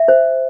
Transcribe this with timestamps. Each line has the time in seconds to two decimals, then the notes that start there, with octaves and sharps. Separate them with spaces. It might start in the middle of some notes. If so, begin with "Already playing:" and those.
Already playing: E5
0.08 C5